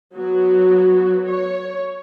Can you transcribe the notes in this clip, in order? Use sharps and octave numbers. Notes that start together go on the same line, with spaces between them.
F#3 B3 F#4
C#5